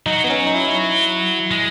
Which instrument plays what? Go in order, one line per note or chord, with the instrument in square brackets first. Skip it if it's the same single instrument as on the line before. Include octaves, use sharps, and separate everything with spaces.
[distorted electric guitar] F#3 [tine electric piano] D#4
[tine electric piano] B3
C#4
D#4
E4
[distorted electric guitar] G#3